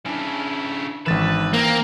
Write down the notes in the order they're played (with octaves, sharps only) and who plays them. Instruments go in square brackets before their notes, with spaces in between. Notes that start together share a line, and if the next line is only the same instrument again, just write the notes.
[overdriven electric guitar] C#3 E4 [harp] C#4 D4
[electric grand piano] G#1 A6 E7 [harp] E3 [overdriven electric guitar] B4
[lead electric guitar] A#3 [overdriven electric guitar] C4